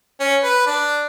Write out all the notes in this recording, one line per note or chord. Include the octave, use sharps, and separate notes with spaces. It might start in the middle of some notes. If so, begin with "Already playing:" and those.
C#4
B4
D4